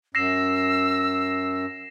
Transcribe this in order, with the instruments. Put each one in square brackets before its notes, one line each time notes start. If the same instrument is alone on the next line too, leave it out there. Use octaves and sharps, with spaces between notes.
[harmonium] F#2 [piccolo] E6 [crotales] A#6 C7 E7